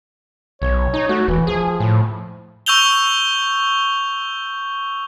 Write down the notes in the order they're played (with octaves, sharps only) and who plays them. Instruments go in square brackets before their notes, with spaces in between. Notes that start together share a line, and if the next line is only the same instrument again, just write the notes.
[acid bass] B1 [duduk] C#5
[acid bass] D#4
[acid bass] A3 [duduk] F#4
[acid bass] E1 [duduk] E3
[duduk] F3 [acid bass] G#4
[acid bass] A2
[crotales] C#6 E6 G6 F7 G7